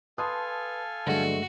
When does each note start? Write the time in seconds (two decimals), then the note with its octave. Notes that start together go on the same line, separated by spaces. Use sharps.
0.18 A4 B4 F5 G#5 A5 C6 D#6
1.07 G2 D3 F#3 G#3 A3 F#4